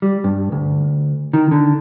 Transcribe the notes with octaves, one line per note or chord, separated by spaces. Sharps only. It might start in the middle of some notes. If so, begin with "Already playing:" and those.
G3
G2
D2
D#3
D3